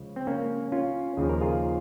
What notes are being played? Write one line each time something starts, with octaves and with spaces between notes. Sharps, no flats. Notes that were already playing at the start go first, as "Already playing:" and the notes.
Already playing: C#2 C#3 F3
C4
A#3 C#4
C#4 F4
D#2 C#3 F3 G#4
A#4
F4 G#4